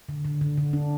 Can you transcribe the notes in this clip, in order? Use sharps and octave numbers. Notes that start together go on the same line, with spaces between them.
D3
D3
D3
D3
D4